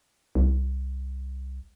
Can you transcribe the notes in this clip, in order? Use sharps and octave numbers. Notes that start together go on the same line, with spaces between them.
C2